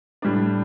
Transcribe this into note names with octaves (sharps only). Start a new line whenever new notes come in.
A2 G3 D4